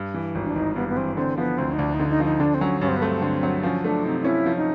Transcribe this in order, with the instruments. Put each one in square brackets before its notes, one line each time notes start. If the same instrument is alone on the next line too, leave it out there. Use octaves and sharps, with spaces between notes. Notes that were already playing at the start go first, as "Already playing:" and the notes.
Already playing: [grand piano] G2
E3
G#1
[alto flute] D4
[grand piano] G#1 [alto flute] D#4
[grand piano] G2 [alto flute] B3
[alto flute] B3
[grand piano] E3 [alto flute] C4
[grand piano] D3 [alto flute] C4
[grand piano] F3 [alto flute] B3
[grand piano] D2 [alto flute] C4
[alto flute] D#4
[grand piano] D2 [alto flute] D4
[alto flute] D#4
[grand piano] D3
[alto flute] D#4
[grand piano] F3 [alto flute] D#4
[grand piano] D3 [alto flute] D4
[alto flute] C4
[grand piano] F#3 [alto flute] C#4
[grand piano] G2 [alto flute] C#4
[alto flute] C4
B3
[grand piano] A3 [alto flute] C4
[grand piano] D3
F#3
[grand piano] F3 [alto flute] C#4
[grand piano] A3 [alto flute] D4
[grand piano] C3 [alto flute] D#4
[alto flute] D#4
[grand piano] C#4 [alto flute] E4
[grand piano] F3
[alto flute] D#4